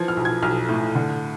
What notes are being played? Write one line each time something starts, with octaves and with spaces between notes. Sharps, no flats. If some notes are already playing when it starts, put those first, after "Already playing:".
Already playing: E3 F3 G#6
F6
B1
G#6
B1 F6
A2
D3